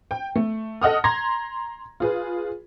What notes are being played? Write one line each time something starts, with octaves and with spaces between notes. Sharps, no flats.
G5
A3
A4 D#5 F#5 D#6 F6
A#5 C6 G#6 A#6
F4 G#4 B4